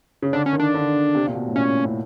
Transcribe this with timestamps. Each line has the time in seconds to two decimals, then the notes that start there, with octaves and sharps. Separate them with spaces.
0.22 C#3
0.33 D3 D4
0.46 C#4
0.53 D#3
0.60 D4
0.74 D3
1.15 C3
1.27 A#2
1.35 B2
1.48 A2
1.56 A#2 C#4
1.85 A2